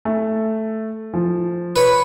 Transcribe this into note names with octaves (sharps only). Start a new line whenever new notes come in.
A3
F3
B4 C#5